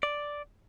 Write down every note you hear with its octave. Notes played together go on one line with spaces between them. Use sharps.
D5